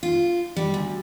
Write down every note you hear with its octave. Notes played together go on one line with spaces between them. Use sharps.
F4
G3
D2